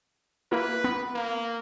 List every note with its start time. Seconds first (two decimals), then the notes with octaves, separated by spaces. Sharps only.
0.52 A#3 E4 B4
0.84 B3
1.15 A#3